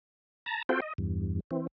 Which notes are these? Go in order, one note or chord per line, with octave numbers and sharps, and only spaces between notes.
A5 A#5
C4 F4 F#4 A4 C5 G5
D#5
E2 G2
E3 C4